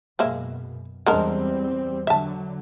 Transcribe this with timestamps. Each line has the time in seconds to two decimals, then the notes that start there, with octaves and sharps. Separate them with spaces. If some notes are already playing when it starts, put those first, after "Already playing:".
0.19 F#2 B2 G#3 A#3 E5
1.07 E2 G3 G#3 C4 D4 A#4
2.07 D3 F#3 E5 A5